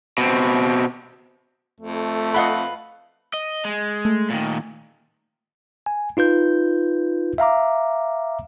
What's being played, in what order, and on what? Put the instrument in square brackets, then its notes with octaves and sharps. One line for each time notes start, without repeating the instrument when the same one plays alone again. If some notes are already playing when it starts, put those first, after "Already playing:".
[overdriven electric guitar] B2 C4
[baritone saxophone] F2 [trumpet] A3
[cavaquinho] F4 B4 [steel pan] D#5 F#5 B5
[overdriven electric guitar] D#5
G#3
[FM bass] A3
[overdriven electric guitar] A#2 D#3
[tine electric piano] G#5
D#4 F4 B4 G6
E5 F5 A#5 D6